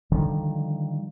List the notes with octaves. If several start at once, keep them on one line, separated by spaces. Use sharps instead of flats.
D3 D#3 F3 G3